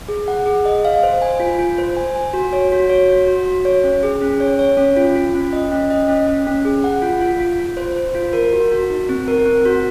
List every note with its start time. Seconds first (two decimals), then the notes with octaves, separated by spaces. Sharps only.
0.08 G#4
0.28 F#5
0.46 G#4
0.65 D#5
0.85 F5
1.03 C5
1.22 G#5
1.40 F4
1.59 F4
1.78 C5
1.97 G#5
2.16 G#5
2.34 F#4
2.53 C#5
2.72 F#4
2.90 C#5
3.09 F#4
3.27 F#4
3.46 F#4
3.65 C#5
3.84 C#4
4.03 G#4
4.22 C#4
4.40 C#5
4.59 C#5
4.77 C#4
4.97 F4
5.16 F4
5.34 C#4
5.53 D#5
5.72 C#4
5.90 D#5
6.08 C#4
6.27 C#4
6.47 C#4
6.65 G#4
6.84 F#5
7.02 F4
7.21 F4
7.40 F4
7.59 F4
7.77 C5
7.96 C5
8.15 F4
8.33 A#4
8.53 F#4
8.72 F#4
8.90 D#4
9.09 C4
9.28 A#4
9.46 C4
9.65 F#4